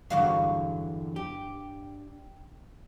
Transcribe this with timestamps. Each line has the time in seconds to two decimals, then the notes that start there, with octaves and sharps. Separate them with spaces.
0.10 E2 G2 D3 F#3 F#4 F5
1.16 G4